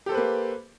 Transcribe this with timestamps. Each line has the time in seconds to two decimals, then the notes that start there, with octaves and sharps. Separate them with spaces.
0.06 G4
0.09 A4
0.12 C5
0.15 B4
0.17 A#3